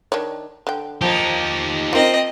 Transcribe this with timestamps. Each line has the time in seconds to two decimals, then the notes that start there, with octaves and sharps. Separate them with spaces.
0.12 D#3 D4 C#5
0.67 D3 G5
1.01 F3 A#3 D#4 G4
1.93 C4 F4 A#4 D#5